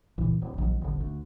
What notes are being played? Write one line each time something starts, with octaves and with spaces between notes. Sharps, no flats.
C#2 A#2 E3
D1
A#1 D#3 F#3
D#1 G#1 D3
D2